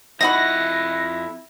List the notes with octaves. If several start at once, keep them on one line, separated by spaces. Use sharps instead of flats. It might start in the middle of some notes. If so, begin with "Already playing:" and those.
F2 D#4 E4 F#4 F#5 B5 A#6